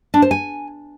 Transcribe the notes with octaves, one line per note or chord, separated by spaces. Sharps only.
D4
C5
G#5